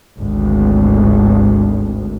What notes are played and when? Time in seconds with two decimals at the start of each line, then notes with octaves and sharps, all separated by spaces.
0.18 G#1 D2